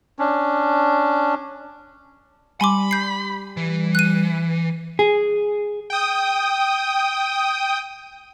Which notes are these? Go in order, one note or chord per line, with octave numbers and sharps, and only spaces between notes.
C#4 D4
G3 G#5 B5 C6 D6
G6 C7
E3
F#6 D#7
G#4
G5 D#6